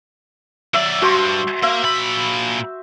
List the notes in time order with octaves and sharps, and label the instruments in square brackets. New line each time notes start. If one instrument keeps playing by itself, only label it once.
[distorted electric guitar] F#3 D5 [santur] E5
[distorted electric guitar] G2 [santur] F#4 C5 C6
[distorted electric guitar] A#3 [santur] E5
[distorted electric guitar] A#2 B5